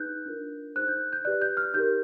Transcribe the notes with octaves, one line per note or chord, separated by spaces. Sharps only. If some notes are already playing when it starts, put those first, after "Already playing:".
Already playing: D#4 G#4 B4 F#6 G6
D4 F4 A#4
D#4 G#4 C5 F#6
G6
G6
G4 B4 D5 F#6
G6
F6
D#4 G4 A#4 G6